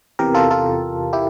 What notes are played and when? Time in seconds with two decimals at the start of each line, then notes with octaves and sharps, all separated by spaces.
0.19 E2 C3 E3 G4 A#4
0.35 F4 A4
0.50 F4 A4
1.13 E4 G4